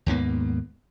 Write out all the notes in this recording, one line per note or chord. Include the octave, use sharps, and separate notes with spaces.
D#2 G#2 A#3 B3